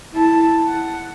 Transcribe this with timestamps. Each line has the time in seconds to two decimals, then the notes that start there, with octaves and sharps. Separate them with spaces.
0.14 E4 A5
0.67 F#5